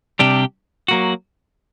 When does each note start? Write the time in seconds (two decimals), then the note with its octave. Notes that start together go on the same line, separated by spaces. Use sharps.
0.19 C3 G3 D4 G4
0.88 F#3 A#3 F#4